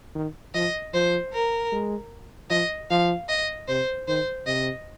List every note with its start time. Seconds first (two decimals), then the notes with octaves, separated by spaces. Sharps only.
0.15 D#3
0.55 F3 D#5
0.94 F3 C5
1.33 A#4
1.72 G#3
2.50 F3 D#5
2.90 F3 F5
3.29 D#5
3.68 C3 C5
4.08 D#3 C5
4.47 C3 D#5